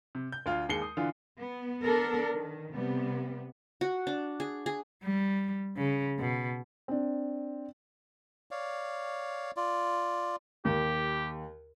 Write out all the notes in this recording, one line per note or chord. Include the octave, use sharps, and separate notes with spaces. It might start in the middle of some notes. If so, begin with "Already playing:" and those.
C3
G6
D2 F4 F5
D#2 G#3 C7 C#7 G7
D#6
D3 E3 F4
B3
B3 D4 A4 A#4
D#3
C3 G3 B3
F#4
D4
G#4
G#4
G3
C#3
B2
C4 D4
C#5 D5 F5
F4 D5
D#2 G4